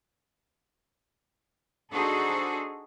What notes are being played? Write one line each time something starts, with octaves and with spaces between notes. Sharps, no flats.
D4 D#4 F#4 G#4 A4 C5